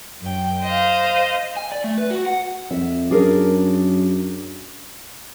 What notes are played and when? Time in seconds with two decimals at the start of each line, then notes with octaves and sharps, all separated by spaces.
0.21 F#2 G5
0.64 C5 D#5 F5
1.57 G#5
1.72 D5
1.84 A3
1.98 B4
2.11 F#4
2.26 F#5
2.71 F2 E5
3.11 F#2 D4 G#4 A#4